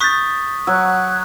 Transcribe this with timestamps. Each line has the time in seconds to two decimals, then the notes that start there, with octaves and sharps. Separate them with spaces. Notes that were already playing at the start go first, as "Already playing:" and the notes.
0.01 C#6 D#6 F#6 G6 A6 B6
0.67 F#3 E6 F#6 G#6